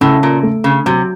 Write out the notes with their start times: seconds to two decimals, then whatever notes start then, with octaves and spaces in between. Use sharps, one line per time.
0.01 A2 C#3
0.23 A#2
0.43 A3
0.64 C#3
0.86 C3 F#3